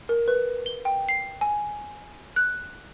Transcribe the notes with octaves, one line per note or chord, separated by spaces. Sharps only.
A#4
B4
G7
G5
C7
G#5
F#6